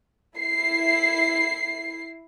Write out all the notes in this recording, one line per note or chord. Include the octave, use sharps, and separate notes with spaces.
E4 C7